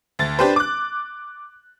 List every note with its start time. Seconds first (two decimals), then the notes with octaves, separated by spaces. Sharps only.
0.19 D2 A6
0.39 D4 G4 B4 C5
0.56 D6 F#6